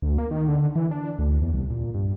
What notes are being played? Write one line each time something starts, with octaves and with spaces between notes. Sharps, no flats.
D2
A#3
D#3
D3
E3
D4
D2
E2
C2
A#2
G2